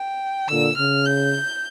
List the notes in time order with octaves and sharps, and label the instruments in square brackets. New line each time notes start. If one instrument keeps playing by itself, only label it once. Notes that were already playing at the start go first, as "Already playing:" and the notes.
Already playing: [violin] G5
[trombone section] A#2 D3 [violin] E6
[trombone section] C#3 [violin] F6
[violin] G6